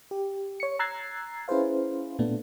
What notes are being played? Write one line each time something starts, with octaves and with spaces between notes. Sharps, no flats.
G4
C#5 C#7
A#5 E6 F#6 G#6 A6 C7
C#4 E4 G#4 B4 C5 F5
A#2 A3 B3 D4